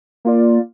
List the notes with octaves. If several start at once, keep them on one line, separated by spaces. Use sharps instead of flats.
A#3 F4 D5